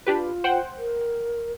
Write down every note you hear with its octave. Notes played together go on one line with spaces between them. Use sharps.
D4 F4 G4 B4
C5 F#5 G5
A#4